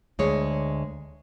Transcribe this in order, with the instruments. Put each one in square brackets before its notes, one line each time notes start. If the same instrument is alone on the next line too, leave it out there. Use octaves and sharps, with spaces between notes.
[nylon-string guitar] D2 G#3 C#5